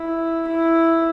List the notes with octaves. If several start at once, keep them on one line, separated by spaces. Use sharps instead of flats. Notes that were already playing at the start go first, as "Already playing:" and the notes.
Already playing: E4
E4